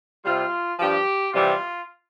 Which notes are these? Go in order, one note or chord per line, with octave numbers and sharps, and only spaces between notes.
C3 G3 F4
G2 F3 G4
C3 E3 G3 F4